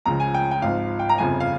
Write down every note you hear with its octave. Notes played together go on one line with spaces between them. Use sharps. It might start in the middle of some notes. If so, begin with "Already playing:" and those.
C#2 C#3 F3 A#5
G#5
G5
G5
G#1 G#2 F3 F5
G5
A#5
G1 F2 C#3 F3 G#5
F5